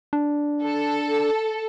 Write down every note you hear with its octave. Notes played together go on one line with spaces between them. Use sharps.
D4
A4